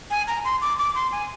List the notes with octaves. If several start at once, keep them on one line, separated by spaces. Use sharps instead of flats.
G#5
A#5
C6
D6
D6
C6
G#5